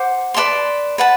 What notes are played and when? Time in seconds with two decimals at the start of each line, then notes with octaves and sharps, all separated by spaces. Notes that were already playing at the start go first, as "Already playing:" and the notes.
Already playing: C5 F#5 D6
0.34 B4 D5 A5 C6
0.98 B4 F#5 A5